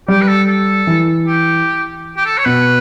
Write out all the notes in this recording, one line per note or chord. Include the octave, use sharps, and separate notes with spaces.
G3 G4
B4
A4
A4
E3
G4
G4
A4
C#5
B2 B4